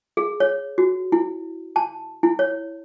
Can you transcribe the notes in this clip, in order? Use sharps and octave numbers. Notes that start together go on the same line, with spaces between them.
G#4
C#5
F#4
E4
A5
E4
C#5